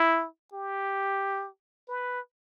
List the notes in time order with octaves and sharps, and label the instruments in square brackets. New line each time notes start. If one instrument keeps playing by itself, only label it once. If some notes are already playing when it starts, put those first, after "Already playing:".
Already playing: [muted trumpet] E4
G4
B4